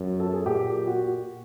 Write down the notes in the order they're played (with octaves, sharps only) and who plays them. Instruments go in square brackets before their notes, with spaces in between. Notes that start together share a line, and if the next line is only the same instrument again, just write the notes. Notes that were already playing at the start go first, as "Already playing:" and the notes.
Already playing: [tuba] F#2
[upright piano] A4
G#4
[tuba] A#2 [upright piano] G4
[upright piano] F#4